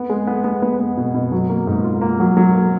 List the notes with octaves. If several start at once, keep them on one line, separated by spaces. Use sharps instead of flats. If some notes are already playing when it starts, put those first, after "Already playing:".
Already playing: B3
G#3
B3
B3
B3
B3
B2
B2
F#3
A#3
G#2
F4
A#3
F#3
F#3
A#3